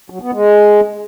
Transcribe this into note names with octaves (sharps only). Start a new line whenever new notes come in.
F#3
B3
G#3